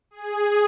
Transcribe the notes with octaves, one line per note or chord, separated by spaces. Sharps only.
G#4